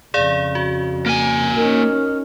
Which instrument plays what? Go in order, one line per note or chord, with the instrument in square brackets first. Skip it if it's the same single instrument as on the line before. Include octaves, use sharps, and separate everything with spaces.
[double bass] F2 C#3 [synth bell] G#4 D5 F5
[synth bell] F#4
[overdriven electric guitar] A#3 G#5
[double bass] C#4 D#4 [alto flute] A#4